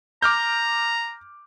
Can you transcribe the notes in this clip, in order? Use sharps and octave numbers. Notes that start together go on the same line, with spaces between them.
A#5 D6 F6 G6